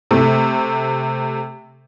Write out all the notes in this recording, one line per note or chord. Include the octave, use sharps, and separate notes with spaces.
C3 A3